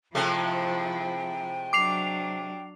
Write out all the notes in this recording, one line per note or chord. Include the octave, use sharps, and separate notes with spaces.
C3 F3 G#3 A3 E4 G5
F#3 D4 D6 C7 F7